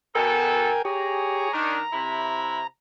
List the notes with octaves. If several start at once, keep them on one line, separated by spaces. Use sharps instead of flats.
B2 A4 A#4 G5 G#5
G4 G#4 C#5 A#5
D#3 D4 A#5
C3 E4 B5